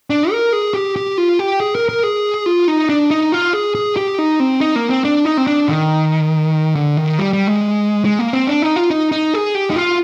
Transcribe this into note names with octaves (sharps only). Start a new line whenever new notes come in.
D4
A#4
G#4
G4
G4
F4
G4
G#4
A#4
A#4
G#4
F4
D#4
D4
D#4
F4
G#4
G#4
G4
D#4
C4
D#4
A#3
C4
D4
D#4
C4
D4
D#3
D3
D#3
G3
G3
G#3
G#3
A#3
C4
D4
D#4
F4
D#4
D#4
G#4
G4
D#4
F4